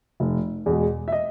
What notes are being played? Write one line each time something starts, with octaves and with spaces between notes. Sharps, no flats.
F1
E2 B2 G#3
E5
D#5